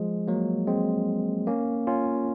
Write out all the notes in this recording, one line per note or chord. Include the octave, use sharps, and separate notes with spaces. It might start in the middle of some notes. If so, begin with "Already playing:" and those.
Already playing: F3 G#3
F#3 A#3
G#3 C4
A#3 C#4
C#4 F4